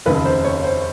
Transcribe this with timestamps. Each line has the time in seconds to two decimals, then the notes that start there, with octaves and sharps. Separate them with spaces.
0.06 F1 D#2 C#3 B4
0.25 C5
0.44 C#5
0.64 C5